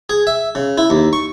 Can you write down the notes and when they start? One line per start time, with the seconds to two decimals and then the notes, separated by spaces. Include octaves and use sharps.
0.10 G#4
0.27 E5
0.55 C#3
0.78 E4
0.90 D#2
1.13 C#6